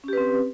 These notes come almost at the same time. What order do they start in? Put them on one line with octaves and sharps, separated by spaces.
C#4 G4 B4 C4